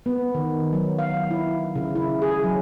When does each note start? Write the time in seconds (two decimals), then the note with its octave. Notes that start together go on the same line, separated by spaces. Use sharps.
0.06 B3
0.35 D#3
0.73 F#3
0.99 F5
1.31 E4
1.76 C#3
1.95 E4
2.22 G#4
2.44 F#3